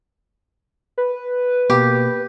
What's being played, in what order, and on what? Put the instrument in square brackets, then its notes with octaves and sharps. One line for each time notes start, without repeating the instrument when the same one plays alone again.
[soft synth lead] B4
[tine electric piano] B2 A#3 [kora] G4